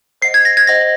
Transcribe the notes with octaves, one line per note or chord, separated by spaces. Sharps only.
C5 D#5 F#5 C7
G#6
A#6
G#6
C5 D#5 F#5 A#6